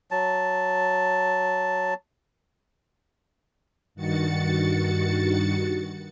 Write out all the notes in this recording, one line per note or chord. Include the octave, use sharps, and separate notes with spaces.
F#3 A5
G2 D#3 F#4 A6 C#7